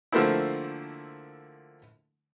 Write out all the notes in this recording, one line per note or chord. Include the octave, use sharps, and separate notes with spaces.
D3 F3 A3 A#3 C4 E4